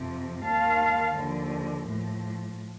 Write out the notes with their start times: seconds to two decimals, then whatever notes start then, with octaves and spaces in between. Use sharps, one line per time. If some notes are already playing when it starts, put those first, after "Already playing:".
Already playing: F2 C3 F3
0.44 D#2 D#3 F5 A5
1.15 D#2 D3 F3
1.85 A2 F3